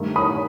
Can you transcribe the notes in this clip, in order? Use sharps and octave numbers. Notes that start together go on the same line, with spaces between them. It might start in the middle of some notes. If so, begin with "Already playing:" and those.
Already playing: G2 D#3 A3
B5 D#6